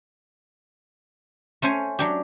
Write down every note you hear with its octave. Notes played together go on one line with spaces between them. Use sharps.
A3 C#4 C5 G#5
F#3 D4 G4